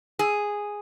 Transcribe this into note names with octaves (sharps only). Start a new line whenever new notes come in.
G#4